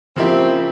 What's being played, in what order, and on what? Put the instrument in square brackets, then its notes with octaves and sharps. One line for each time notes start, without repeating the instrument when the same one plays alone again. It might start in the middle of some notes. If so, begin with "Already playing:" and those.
[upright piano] C#3 F3 A#3 E4 G4 [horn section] C4